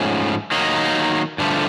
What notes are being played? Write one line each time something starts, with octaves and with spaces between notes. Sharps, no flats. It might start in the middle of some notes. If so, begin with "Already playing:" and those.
Already playing: G#2 F3 A3 C#4
D#3 F#3 A#3 D#4
G2 D3 F3 A3